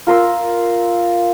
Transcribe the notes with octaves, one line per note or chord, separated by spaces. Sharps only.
F4 A#4 C6 E6